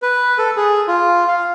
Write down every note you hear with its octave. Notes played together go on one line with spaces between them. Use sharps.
B4
A4
G#4
F4
F5